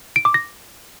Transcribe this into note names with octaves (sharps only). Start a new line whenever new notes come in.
D7
D6
A#6